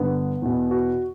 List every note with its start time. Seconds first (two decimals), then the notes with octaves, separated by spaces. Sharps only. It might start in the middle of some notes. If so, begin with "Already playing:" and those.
Already playing: G2 D3 B3
0.42 E2 B2
0.71 F#4